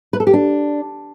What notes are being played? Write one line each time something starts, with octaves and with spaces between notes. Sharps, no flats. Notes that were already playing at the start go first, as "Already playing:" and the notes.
B4
A4
G4
D4